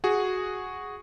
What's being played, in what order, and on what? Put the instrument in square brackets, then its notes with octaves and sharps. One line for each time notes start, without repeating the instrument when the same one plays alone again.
[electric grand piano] F#4 G#4